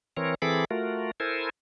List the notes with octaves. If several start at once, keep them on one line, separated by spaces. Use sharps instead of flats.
E3 C4 A#4 C#5
E3 C4 G#4 A4 B5 D6
A3 F4 F#4 A#4
E4 A4 A#4 C5 G#5